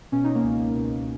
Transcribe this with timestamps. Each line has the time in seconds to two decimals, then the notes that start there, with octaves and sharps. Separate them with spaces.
0.12 B2 C#4
0.24 D#4
0.35 A#3 C#4
0.44 C#2
0.74 B2